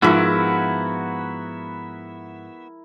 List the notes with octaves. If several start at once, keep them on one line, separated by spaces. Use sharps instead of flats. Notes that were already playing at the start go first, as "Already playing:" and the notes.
G#2 F3 B3 E4 F#4 A#4 E5